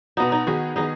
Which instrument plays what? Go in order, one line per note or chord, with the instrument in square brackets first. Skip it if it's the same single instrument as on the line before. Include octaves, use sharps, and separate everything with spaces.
[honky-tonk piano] B2 B3 F#4 [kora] D#4
[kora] D#4
[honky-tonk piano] D#3 B3 G#4 [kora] F#4
[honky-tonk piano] D#3 B3 G#4 [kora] D#4